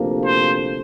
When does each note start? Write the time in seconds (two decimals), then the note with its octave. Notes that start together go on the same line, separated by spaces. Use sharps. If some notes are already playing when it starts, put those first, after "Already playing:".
Already playing: D2 C3 F3 A#3
0.24 C5